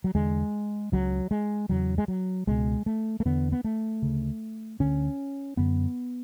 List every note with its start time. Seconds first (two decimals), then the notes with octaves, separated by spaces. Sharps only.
0.04 F#3
0.15 E2 D3 G#3
0.92 C#2 C#3 F#3
1.31 G#3
1.69 E2 C#3 F#3
1.98 G#3
2.08 F#3
2.47 C#2 B2 G#3
2.86 A3
3.20 A3
3.25 E2 D3 B3
3.52 B3
3.64 A3
4.02 D2 C#3
4.80 D2 D3 C#4
5.57 F#2 D3 B3